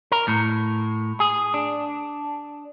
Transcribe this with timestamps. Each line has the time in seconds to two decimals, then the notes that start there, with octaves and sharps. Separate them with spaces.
0.12 A#4
0.28 A2
1.20 G#4
1.54 D4